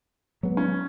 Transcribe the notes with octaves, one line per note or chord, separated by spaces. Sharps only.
F#3 G#3 B3
C#4